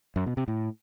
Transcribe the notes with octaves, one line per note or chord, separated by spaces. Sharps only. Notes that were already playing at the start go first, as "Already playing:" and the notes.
F#2
B2
C3
A2